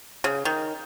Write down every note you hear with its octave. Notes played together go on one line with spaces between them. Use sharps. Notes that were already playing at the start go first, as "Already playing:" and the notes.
C#3
D#3